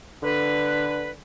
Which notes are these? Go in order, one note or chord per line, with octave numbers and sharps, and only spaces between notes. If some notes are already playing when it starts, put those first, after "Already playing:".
D3 B4